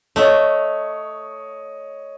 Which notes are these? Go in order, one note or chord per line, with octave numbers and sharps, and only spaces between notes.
A3 C#5 D#5